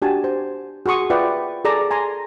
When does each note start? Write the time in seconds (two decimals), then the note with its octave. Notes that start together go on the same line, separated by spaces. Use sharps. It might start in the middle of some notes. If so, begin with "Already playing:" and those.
0.02 D4 F#4 G4 G#5 A5
0.24 C5
0.86 F#4 G#4 C6 C#6 D#6
1.10 F4 B4 D5 E5 F#5 G5
1.65 G#4 A4 D5 A#5
1.91 G#5 A#5 C6